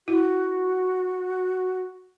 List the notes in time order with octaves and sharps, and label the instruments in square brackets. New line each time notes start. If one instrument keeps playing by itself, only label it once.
[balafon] E4 [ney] F#4